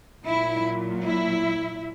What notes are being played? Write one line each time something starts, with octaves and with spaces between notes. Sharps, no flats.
A#2 F#3 E4
E4